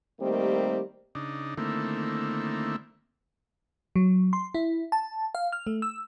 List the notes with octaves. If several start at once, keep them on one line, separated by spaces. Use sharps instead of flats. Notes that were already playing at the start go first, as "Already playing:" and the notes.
D#3 G3 A3 A#3 C4 G4
C#3 D4 D#4
D3 D#3 A3 A#3 C4 E4
F#3
C6
E4
A5
F5
F6
A3
E6